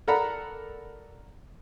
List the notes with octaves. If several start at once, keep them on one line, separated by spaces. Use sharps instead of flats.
A4 A#4 D5 F#5 A#5 B5